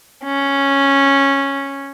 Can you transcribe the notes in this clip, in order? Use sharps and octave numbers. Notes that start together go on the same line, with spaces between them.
C#4